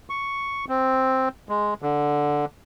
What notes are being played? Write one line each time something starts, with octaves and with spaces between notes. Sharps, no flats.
C#6
C4
G#3
D3